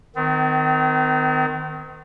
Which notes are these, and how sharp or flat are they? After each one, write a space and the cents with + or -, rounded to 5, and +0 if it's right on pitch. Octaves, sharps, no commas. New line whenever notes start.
D#3 -10 C4 -45